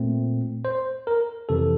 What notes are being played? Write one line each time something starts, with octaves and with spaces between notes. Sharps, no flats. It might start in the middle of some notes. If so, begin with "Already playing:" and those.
Already playing: A#2 A3 C4
C5
A#4
F2 C3 E3 A4